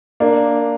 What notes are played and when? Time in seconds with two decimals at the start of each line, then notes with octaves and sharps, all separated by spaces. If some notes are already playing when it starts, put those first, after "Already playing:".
0.20 A#3 D4